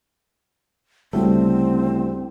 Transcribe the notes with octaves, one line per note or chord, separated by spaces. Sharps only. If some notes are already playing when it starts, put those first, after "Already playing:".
D2 C#3 G3 A3 C4 E4